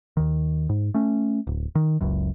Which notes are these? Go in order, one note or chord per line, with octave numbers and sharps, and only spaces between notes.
D#2 D#3
G#2
A3 C#4
D1
D#3
F#1 C#2 F#2